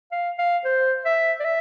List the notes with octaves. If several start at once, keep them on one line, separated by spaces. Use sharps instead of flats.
F5
F5
C5
E5
D5
E5